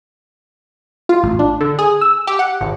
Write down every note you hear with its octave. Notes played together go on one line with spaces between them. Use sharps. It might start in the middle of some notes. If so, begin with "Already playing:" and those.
F4
A1
D4
D3
G#4
E6
G4
F#5
G#1